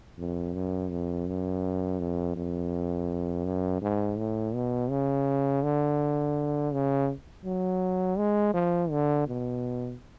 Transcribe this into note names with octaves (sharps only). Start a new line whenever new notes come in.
F2
F#2
F2
F#2
F2
F2
F#2
G#2
A2
B2
C#3
D3
C#3
F#3
G#3
F3
D3
B2